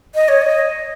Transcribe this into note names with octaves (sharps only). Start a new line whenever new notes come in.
D#5
C#5
D#5